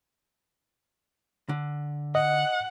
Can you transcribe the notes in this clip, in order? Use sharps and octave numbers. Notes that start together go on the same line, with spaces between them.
D3
D#5 F#5